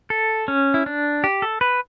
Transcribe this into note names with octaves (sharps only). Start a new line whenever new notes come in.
A4
C#4
E4
D4
G4
A4
B4